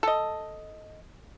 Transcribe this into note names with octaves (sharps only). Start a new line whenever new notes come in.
A4 D#5